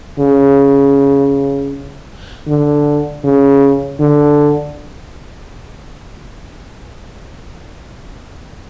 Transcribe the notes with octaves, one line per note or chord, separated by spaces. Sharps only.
C#3
D3
C#3
D3